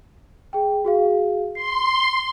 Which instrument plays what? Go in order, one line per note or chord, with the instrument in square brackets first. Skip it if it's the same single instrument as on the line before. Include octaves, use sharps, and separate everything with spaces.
[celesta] G#4 G5
F#4 G#4 F5
[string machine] C6 [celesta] C7